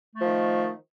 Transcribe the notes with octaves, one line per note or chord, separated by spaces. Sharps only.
D#3 F3 A3